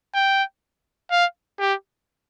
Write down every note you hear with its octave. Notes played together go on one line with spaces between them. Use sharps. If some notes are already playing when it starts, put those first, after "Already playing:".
G5
F5
G4